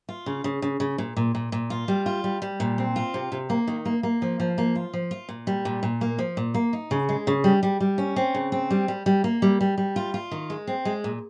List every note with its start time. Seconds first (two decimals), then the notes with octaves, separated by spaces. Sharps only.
0.09 F4
0.26 C#3
0.44 C#3
0.62 C#3
0.80 C#3
0.98 A#2
1.17 A#2
1.35 A#2
1.52 A#2
1.70 F4
1.88 G3
2.06 F4
2.24 G3
2.42 G3
2.60 A#2
2.78 C4
2.96 F4
3.14 C3
3.32 C3
3.50 A#3
3.67 D#3
3.86 A#3
4.03 A#3
4.22 F3
4.40 F3
4.58 A#3
4.75 F4
4.93 F3
5.11 F4
5.29 A#2
5.47 G3
5.65 A#2
5.83 A#2
6.01 A#3
6.19 F3
6.37 A#2
6.54 A#3
6.73 D#4
6.91 C#3
7.09 G#3
7.27 C#3
7.44 G3
7.63 G3
7.80 G3
7.98 C#4
8.16 C4
8.34 C#3
8.52 C4
8.70 G3
8.88 G3
9.06 G3
9.24 A#3
9.42 G3
9.61 G3
9.78 G3
9.96 F4
10.14 F4
10.31 D#3
10.50 G#3
10.67 C4
10.85 G#3
11.04 A#2